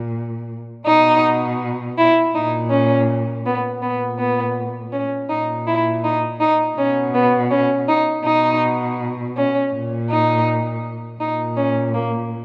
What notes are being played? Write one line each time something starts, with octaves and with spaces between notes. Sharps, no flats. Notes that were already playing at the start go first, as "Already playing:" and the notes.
Already playing: A#2
B2 D#4
E4
A#2 D#4
C#4
B3
A#2 B3
B3
C#4
A#2 D#4
E4
D#4
D#4
B2 C#4
B3
C#4
D#4
B2 D#4
C#4
A#2
D#4
A#2 D#4
C#4
A#3